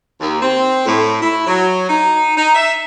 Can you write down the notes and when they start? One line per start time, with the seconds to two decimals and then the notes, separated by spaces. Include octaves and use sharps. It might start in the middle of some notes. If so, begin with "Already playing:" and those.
0.20 D#2
0.42 C4
0.86 A2
1.21 E4
1.47 F#3
1.89 D#4
2.36 D#4
2.54 E5